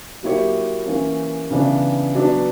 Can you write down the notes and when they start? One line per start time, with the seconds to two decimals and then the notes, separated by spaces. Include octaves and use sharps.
0.23 F#3 A#3 E4 G4 C#5
0.86 E3 A#3 C#4
1.51 C#3 E3 B3 D4
2.14 F#3 B3 D4